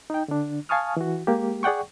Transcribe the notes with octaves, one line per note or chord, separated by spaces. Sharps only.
D#4 G5
D3 D4
F5 G#5 A5 C#6 D#6 F6
E3 F#4
G#3 A#3 G4
G#4 D5 F#5 G5 C#6